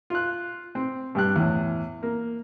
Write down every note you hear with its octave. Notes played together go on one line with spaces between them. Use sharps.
F4 F#6
C4
G2 G4 F#6
E2 A2
A#3